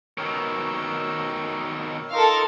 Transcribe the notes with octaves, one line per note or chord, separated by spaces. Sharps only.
B2 D#3 A#4 C#5 E6
D#4 F4 A4 A#4 F5